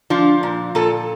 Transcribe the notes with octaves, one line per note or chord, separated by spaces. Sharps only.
F3 D4 F4
A#2
A#2 F4 A4